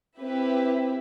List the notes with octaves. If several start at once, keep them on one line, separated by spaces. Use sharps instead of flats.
C4 E4 G4 B4 E5